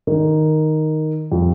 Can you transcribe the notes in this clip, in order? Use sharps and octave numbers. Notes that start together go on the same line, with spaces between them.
D#3
F2